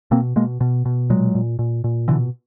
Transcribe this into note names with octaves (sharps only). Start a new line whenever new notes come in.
B2 A#3 C4
B2 G#3 A#3
B2
B2
A#2 F#3 G#3
A#2
A#2
A#2
B2 D3 E3